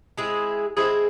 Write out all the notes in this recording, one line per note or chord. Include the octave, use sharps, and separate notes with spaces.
G#3 C4 E4 G#4
G#3 C4 E4 G#4